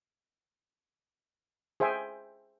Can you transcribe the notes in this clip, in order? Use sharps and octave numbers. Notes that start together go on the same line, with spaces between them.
G#4 C5 E5 G5 G#5